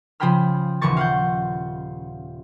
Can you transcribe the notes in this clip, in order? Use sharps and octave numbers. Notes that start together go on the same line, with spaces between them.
C#3 F3 G#4 G5 B5 F6
D#1 C#3 E3 F3 C#6 A6
F5 F#5 G6